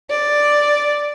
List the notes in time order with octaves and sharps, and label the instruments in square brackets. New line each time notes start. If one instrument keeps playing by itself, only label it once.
[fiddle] D5